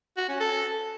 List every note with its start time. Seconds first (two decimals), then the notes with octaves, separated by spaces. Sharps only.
0.17 F#4
0.29 C#4
0.40 A4